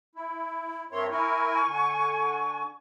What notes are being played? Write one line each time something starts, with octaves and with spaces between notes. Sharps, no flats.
E4
G2 C4 A#4 C#5 E5 C6
E4 A#4 G#5 C#6
D3